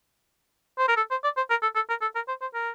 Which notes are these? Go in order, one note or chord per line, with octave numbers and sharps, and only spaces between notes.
C5
A#4
A4
C5
D5
C5
A#4
A4
A4
A#4
A4
A#4
C5
C5
A#4